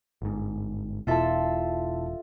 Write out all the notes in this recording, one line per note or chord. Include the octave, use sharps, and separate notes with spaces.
G1 G#2
E1 B2 E4 F4 A4 E5 A5